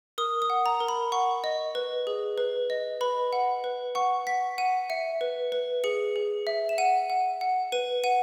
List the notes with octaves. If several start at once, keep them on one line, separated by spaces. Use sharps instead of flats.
A#4 D#6
D#6
F#5
A#5
A#4
B5
F#5 C#6
D#5
B4
G#4
B4
D#5
B4 B5
F#5
B4
F#5 C#6
F#5 B6
F#5 D#7
E5 C#7
B4
B4
G#4 C#7
G#4
E5
E7
F#5 D#7
F#5
F#5
B4 D#7
F#5 D#7